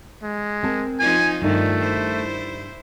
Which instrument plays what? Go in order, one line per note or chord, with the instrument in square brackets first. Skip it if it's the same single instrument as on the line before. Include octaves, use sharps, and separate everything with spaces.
[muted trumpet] G#3
[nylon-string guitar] C4 A#4 A5
[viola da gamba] F3 D#4 F4 [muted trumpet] G#5
[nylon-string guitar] G2 D#4 [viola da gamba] D#3 F3 [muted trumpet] A3
[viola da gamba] E4 C5